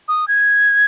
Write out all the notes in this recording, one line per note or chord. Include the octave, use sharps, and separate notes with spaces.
D#6
G#6